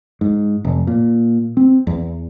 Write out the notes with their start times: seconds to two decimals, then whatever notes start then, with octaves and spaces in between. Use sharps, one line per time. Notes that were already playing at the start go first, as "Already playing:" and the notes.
0.21 G#2
0.65 F1
0.87 A#2
1.57 C4
1.87 E2